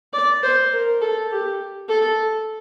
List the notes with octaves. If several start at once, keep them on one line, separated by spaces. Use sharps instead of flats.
D5
C5
A#4
A4
G4
A4